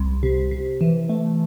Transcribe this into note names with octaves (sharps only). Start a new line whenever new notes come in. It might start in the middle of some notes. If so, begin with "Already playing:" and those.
Already playing: C2
C3
C3
E3
A3